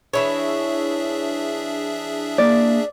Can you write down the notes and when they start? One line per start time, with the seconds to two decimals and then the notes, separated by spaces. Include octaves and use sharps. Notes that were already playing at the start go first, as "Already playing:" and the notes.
0.13 E3 D4 E4 G#4 C#5 E5
2.38 A#3 D5